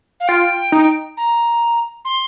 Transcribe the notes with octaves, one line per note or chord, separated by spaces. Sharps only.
F5
F4 G5
D#4
A#5
C6